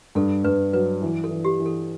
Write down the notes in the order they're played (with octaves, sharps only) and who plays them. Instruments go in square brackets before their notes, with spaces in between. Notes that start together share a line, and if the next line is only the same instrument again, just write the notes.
[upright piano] G2 [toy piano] A4
[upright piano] G2 [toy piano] B4
[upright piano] F#3 [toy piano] B4
[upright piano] E3
[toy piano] A4
[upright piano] E3
[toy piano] G4
[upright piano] E3
[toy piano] A4